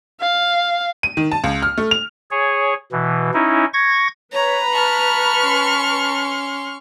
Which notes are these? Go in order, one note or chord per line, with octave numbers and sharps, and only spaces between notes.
F5
D#7
D#3
A5
C#2
F6
A3
F7
G#4 C#5
B2 E3
C#4 D#4 E4
C#6 G#6 A#6
B4 C#5 A#5 B5
A5 C#6 F6
C#4 C6